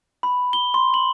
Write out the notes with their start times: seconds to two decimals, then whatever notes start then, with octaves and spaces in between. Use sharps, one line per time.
0.23 B5
0.53 G7
0.74 C6
0.94 F#7